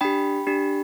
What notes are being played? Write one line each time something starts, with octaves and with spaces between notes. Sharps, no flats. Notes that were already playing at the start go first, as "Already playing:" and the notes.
D4 G4 G5 B5
D4 G4